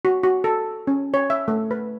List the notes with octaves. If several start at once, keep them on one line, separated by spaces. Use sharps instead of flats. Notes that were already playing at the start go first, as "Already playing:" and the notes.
F#4
F#4
A4
C#4
C#5
E5
A3
B4